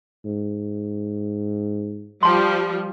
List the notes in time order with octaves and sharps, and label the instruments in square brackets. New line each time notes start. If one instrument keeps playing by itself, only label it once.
[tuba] G#2
[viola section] F3 G3 [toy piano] A5 C6